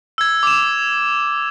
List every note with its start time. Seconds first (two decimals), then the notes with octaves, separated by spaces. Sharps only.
0.18 E6 G#6
0.43 D6 E7